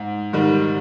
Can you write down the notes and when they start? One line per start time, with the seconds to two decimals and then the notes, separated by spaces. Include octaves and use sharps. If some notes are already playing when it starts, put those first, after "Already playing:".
Already playing: G#2
0.33 G#2 D#3 G3